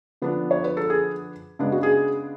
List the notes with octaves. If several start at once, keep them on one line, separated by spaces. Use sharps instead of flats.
D3 F3 B3 D4
C#5
B4
A4
G#4
C#3 G#3 B3 D4
F#4
G#4